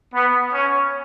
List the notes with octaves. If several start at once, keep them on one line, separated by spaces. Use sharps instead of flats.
B3
C#4